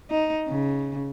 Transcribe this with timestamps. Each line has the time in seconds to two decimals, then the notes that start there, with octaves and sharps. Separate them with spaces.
0.10 D#4
0.48 C#3